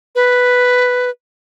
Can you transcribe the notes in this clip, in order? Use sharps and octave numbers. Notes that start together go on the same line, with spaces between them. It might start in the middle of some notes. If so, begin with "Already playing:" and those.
B4